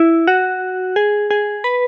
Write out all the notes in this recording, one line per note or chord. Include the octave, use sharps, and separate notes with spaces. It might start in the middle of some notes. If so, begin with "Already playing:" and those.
Already playing: E4
F#4
G#4
G#4
B4